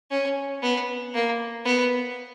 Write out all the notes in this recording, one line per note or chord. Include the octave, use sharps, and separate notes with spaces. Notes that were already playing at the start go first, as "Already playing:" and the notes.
C#4
B3
A#3
B3